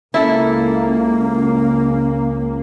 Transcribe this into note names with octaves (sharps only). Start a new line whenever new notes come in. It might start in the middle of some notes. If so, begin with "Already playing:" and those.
C#2 A#3 C#4 E4 A4